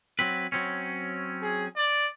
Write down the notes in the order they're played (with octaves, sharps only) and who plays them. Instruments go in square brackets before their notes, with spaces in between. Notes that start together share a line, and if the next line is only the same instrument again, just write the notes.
[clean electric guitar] F#3 C4 B4
F#3 C4 C#4
[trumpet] G#4
D5